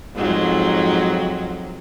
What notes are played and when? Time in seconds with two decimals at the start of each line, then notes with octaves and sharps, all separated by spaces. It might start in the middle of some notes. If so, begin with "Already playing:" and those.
0.15 F2 G#2 F#3